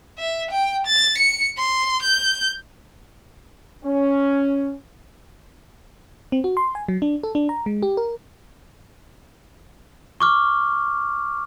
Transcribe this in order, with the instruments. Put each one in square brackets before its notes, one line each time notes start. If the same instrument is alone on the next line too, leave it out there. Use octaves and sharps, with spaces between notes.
[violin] E5
G5
A6
C#7
C6
G6
[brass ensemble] C#4
[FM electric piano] C4
F#4
C6
G#5
F#3
D4
A4
D4
A#5
G#3
G4
A#4
[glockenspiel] C#6 D6 F6